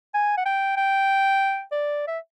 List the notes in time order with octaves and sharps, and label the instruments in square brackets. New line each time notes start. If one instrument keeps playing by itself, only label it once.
[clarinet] G#5
F#5
G5
G5
D5
E5